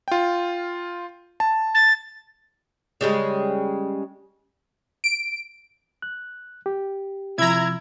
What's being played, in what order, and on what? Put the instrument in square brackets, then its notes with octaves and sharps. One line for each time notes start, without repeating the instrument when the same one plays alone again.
[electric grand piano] F4 G5
A5
[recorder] A6
[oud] C#3 G3 G#3
[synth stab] D7
[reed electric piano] F#6
G4
[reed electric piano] C3 F3 [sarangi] E4 [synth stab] A#5 G#6